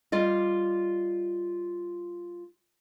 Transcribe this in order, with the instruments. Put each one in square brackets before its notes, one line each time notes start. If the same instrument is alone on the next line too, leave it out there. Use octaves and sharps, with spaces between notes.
[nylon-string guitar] G3 F4 D5 D#5